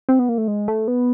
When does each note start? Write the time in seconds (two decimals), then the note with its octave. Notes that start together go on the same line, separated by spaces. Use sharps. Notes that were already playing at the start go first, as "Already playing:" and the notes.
0.09 C4
0.19 B3
0.29 A#3
0.38 A3
0.48 G#3
0.68 A3
0.88 B3